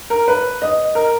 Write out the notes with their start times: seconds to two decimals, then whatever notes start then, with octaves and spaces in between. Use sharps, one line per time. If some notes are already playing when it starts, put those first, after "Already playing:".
0.10 A#4
0.28 B4
0.62 D#5
0.95 A#4